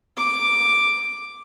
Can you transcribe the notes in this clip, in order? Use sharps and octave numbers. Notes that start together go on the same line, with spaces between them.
D6